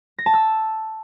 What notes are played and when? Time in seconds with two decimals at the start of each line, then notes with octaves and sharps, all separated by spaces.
0.19 A#6
0.26 A5
0.34 E6